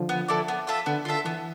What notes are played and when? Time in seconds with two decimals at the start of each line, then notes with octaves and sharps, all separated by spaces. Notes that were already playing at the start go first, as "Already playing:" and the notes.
Already playing: D3 F3
0.09 B3
0.28 E4 A4 D5
0.48 B3
0.67 F4 A4 E5
0.86 D3 B3
1.05 F4 A4 E5
1.25 E3 B3